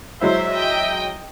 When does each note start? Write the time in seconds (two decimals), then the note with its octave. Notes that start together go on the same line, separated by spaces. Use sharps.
0.21 F#3 G#3 E4 C5 E5
0.53 D#5 G5